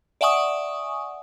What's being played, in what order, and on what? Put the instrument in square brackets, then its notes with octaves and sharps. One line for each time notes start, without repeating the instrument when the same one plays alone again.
[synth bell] D5 E5 F#5 G#5 C#6 D#6